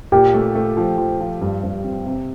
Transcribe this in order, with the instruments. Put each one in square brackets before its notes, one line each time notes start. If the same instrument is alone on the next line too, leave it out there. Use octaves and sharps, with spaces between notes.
[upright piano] A#2 [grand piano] G4
[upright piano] A3
A3
F3
F3
F3
G2
G2
C4
C3